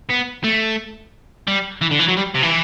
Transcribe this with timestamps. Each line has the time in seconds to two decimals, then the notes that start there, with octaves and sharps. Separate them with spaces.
0.09 B3
0.44 A3
1.47 G3
1.81 E3
1.91 D3
1.99 E3
2.08 F#3
2.17 G3
2.34 C3
2.42 E3